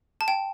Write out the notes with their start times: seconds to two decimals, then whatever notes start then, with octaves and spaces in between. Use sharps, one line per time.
0.21 A5
0.28 G5